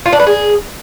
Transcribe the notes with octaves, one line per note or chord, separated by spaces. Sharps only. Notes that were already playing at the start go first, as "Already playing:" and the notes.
F4
D4
B4
G#4